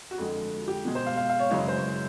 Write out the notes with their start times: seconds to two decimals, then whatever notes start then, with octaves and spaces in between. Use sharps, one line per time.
0.11 F#4
0.18 F2 D3 F3 G#3
0.68 G4
0.85 B2 G#3
0.95 C5
1.07 F5
1.17 F5
1.29 F5
1.39 C#5
1.50 F#2 C#3 E3 G#3 C#5
1.68 C5